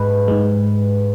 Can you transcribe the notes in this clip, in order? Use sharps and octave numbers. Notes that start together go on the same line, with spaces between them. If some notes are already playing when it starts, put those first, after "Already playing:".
Already playing: G#2 G#3 B4
G#2 G#3